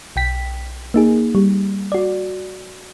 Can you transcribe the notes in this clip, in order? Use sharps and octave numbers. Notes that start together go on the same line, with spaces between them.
B1 G5 B6
A#3 D#4 G#4
G3
F#4 D5